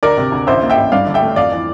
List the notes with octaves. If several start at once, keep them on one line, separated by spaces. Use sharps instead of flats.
D2 A#4 D5
C3
D2
A1 C5 E5
A#3
E5 G5
A1
G2 D5 F5
G1
E5 G5
A3
F2 D5 F5
E3